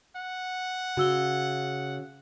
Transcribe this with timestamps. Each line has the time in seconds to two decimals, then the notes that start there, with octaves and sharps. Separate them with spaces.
0.16 F#5
0.97 C#3 F#4 E6 G7